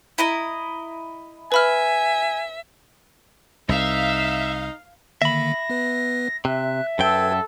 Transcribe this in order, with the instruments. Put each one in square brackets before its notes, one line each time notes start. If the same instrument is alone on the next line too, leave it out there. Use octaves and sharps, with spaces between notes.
[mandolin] E4 D#5 A#5
[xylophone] B4 B5 F6 [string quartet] E5 [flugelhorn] G#5
[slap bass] C2 [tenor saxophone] D#4 [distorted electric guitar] E5 [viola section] F5
[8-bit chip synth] D3 D#3 A#3 [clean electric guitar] E5 B5 [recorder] A#6
[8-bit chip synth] B3 B4
[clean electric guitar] C3 [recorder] E5 [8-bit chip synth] F#6
[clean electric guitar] F#2 G5 [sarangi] A4 [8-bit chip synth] B4 E6 G#6